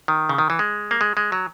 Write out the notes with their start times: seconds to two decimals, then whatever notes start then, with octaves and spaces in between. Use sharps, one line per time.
0.08 D#3
0.29 C#3
0.38 D#3
0.50 E3
0.59 G#3
0.91 A#3
1.01 G#3
1.17 G#3
1.32 F#3